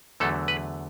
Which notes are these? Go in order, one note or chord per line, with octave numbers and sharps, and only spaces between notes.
E2 D3 F#3 A3 A4
B4